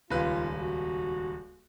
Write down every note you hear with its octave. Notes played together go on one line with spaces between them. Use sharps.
D#1 C#2 F4 B4
F#4